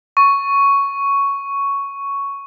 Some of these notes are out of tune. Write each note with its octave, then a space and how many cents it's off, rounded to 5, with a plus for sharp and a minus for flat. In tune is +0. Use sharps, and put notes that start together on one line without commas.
C#6 +5